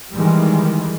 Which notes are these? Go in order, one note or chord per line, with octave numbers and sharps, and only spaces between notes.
D#3 E3 G3 G#3